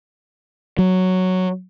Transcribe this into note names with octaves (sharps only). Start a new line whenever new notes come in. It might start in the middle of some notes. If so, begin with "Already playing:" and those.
F#3